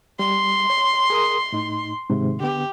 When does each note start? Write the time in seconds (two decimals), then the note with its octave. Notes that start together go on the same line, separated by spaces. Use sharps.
0.19 G3 C6
0.70 C#5
1.10 G#4 A#4 D#6
1.52 A2 D#4
2.10 G#2 C3 D#3
2.40 D3 B3 G4